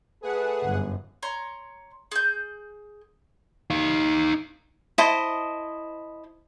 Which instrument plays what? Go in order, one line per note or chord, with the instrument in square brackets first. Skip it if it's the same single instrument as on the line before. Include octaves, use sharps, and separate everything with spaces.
[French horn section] A3 A4 B4 [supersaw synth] G#4 F#5
[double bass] G1 F#2
[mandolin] C#5 A#5 C6
G#4 G6
[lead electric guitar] D#4 F5
[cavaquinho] E4 C5 D#5 A5